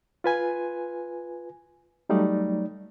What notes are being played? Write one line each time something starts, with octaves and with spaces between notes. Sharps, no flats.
F4 B4 G#5
F#3 G3 A3 D#4 D5